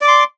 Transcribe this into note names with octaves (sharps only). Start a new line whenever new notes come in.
D5 C6 D6